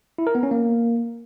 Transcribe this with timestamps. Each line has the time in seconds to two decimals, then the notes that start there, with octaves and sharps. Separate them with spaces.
0.18 E4
0.27 A#4
0.35 B3
0.43 C#4
0.51 A#3